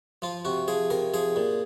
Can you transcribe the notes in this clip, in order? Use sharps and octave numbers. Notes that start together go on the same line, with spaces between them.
F3 F4
C3 F#4
F3 G#4
C3 A#4
F3 G#4
A#2